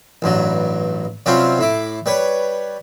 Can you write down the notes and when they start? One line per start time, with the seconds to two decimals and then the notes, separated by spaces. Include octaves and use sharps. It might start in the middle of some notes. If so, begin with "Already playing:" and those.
0.22 A1 G2 F#3
1.26 C3 F#3 G3 C4 C#4 F4
1.59 A2 E4 D6
2.06 G3 B4 C#5